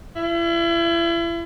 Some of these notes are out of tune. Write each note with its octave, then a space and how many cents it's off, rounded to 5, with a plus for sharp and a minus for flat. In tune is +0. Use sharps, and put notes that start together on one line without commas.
E4 +35